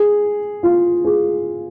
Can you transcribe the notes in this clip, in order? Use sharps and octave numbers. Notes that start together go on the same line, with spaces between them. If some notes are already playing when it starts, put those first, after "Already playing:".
Already playing: G#4
F4
G#4